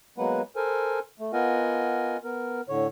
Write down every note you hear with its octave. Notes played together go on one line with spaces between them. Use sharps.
F#3 G#3 A#3 B3 B4 F#5
A4 A#4 C5 G#5
A3
B3 F4 A#4 D#5 F#5 G#5
B3 A#4
A2 D3 C#5